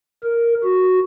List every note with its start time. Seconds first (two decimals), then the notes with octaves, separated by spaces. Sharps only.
0.24 A#4
0.64 F#4